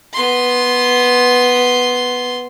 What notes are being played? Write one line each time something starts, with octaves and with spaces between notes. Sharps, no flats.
B3 C6